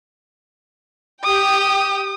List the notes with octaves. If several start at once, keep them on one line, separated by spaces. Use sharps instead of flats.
G4 G5 D#6